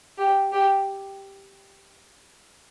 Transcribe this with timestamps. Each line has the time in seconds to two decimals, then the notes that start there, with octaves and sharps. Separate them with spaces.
0.18 G4
0.52 G4